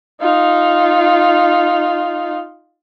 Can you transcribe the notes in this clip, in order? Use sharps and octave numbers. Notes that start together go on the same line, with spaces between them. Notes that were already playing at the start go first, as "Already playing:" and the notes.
D#4 F4